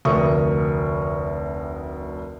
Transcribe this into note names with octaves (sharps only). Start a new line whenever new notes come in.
F1 D2 A#4 E5 C#6 D#6